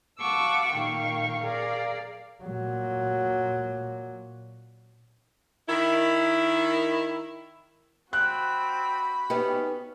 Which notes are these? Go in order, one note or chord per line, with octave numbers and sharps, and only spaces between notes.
F5 F#5 A5 C#6 D6 E6
A#2 D#3 F5 G5 C#6
G#4 A#4 D5 F5
A#2 F#3
D#3 E4
C4 F#4 B5 F#6
B3 C#4 D#4 G4